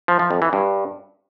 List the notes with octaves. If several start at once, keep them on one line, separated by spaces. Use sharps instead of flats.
F3
F3
F2
E3
G2